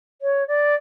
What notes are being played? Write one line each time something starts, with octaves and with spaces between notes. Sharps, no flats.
C#5
D5